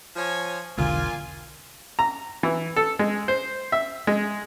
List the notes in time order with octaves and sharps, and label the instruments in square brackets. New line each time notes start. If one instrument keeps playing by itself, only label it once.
[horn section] F3 C#5 G#5
[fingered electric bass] E1 B1 D3 [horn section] A#2 F4 G#5
[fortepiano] A#5
E3
A4
G#3
C5
E5
G#3